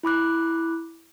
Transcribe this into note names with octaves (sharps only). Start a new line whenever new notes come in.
E4 B5 D6 F#6